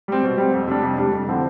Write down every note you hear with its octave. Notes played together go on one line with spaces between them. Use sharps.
G3 C4
B2
G3 C4
F2
C3 G3 D4
F2
C3 G3 D4
F2
D3 F3 C4 E4